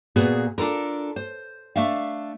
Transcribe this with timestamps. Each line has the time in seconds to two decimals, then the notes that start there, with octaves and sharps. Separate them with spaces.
0.16 A#2 B3 F#4 G#4
0.58 D4 F4 A4 A#4
1.16 C5
1.76 A3 D4 E5 F5